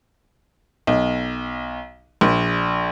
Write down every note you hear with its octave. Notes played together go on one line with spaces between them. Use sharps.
B1
A#1